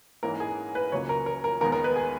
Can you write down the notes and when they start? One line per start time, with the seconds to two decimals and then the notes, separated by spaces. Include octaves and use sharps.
0.23 G#2 E3 A#3 C#4 A#4
0.40 G#4
0.75 B4
0.92 C#2 C#3 F#3 A#3 C#4 C#5
1.09 A#4
1.26 A#4
1.44 A#4
1.61 D#2 D#3 G#3 B3 A#4
1.72 A#4
1.84 B4
1.96 G#4